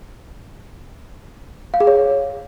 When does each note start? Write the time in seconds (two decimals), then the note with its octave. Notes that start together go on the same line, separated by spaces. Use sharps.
1.74 F5
1.80 G#4
1.87 C#5